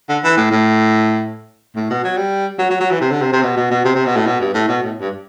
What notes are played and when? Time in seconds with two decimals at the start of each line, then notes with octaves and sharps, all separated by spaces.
0.09 D3
0.24 E3
0.37 A2
0.51 A2
1.76 A2
1.90 B2
2.04 F#3
2.17 G3
2.59 F#3
2.70 F#3
2.80 F#3
2.91 E3
3.01 C3
3.11 D3
3.22 C3
3.33 C3
3.43 B2
3.57 B2
3.71 B2
3.85 C3
3.96 C3
4.06 B2
4.16 A2
4.26 B2
4.40 G2
4.54 A2
4.68 B2
4.82 A2
5.00 G2